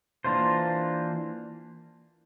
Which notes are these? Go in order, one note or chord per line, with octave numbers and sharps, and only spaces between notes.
E3 A#3 D4 F4 C5